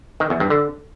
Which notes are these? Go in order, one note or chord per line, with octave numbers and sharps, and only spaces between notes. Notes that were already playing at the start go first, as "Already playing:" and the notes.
D#3
E2
G2
D3